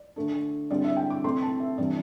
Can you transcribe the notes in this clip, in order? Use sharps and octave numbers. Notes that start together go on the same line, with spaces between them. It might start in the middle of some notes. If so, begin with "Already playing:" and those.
Already playing: D5
D3 A3 D4
D3 G3 C4 E4 D5
E5
G5
D6
C3 A3 C4 E4 C6
A5
E5
C3 E3 G3 D4 D5